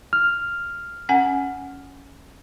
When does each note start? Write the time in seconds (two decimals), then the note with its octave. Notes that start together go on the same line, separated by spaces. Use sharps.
0.13 F6
1.09 C#4 F#5 G#5